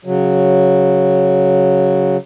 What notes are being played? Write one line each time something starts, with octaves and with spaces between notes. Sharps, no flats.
C#3 F#3